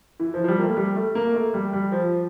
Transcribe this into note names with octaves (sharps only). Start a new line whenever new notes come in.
E3
F3
F3
G3
A#3
A3
G3
A3
A#3
A3
G3
G3
F3